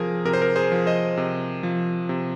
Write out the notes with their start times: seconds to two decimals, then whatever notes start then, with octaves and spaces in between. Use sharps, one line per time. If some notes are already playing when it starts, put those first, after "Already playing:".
Already playing: C3 F3 G#4 A#4
0.25 C3 A#4
0.33 C5
0.42 A#4
0.56 G#4 C5
0.72 F3
0.87 C5 D#5
1.17 C3
1.63 F3
2.09 C3